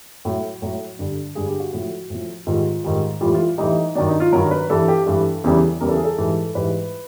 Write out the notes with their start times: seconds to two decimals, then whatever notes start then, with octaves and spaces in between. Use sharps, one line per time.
0.25 A2 F#3
0.62 A2 F#3
0.99 G2 D3 G3
1.35 G2 D3 G3 G#4
1.48 G4
1.60 F#4
1.73 A2 F3
2.10 A2 F3
2.47 G#2 D#3 G3 F4
2.84 G#2 D#3 G3
3.21 A2 E3 G3 F4
3.34 F4
3.58 A2 E3 G3 D#4
3.95 G2 D#3 F#3 D4
4.07 D#4
4.20 F4
4.32 G2 D#3 F#3 A#4
4.51 B4
4.70 G2 E3 G3 A4
4.88 G4
5.06 G2 E3 G3 A4
5.44 E2 C#3 E3 G3
5.81 E2 C#3 E3 G3 A#4
5.89 A4
5.97 G#4
6.05 A4
6.18 G#2 E3 G3
6.55 G#2 E3 G3 B4